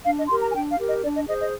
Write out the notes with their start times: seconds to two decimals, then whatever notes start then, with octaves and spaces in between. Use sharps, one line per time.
0.05 D4 F5
0.18 D#5
0.29 G4 A#4 C6
0.42 A#5
0.51 G#5
0.54 D4 G5
0.70 F5
0.78 G4 A#4
0.87 D#5
1.03 D4 D5
1.15 D#5
1.28 G#4 C5 D#5
1.40 D#5